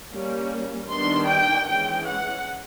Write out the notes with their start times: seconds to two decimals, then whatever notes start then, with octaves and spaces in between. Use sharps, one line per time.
0.12 G3 A#3 C#4
0.90 D#3 G3 B3 D4 C6
1.29 G5
1.68 E3 G#3 C#4 G5
2.08 F#5